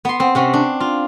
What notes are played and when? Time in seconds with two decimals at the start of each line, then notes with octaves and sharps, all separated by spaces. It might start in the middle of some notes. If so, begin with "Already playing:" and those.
0.05 B3 C6
0.20 C4
0.35 C3 C4 C#4
0.53 D4
0.80 F4